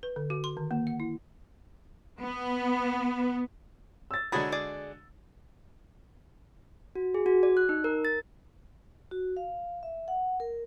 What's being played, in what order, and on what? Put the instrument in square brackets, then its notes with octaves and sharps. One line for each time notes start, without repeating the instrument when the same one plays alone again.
[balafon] B4
D3
F#4
C6
D#3
A#3
F#5
E4
[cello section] B3
[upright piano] E6 A6
[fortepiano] D3 G#3 F#4 [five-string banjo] F#3 G#4 B5 [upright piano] A6
[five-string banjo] G#4 D5
[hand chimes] F#4
G#4
F#4
D5
F#6
D#4
A#4
A6
[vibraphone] F#4
F5
E5
F#5
A#4